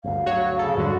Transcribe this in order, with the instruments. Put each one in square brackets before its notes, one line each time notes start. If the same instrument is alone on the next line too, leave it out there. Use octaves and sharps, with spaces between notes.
[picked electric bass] G1 D2 [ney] F5
[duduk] F#3 [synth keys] F#4 C#5
[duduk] C#3 [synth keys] A4
[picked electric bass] F2 G#2 G3 [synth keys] D3 F#3 [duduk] F#4